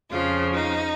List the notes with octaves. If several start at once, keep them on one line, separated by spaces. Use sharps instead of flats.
F2 C#3 F3 F4
D#4